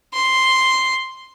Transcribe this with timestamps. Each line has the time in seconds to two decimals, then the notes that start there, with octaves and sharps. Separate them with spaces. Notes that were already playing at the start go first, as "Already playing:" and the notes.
0.14 C6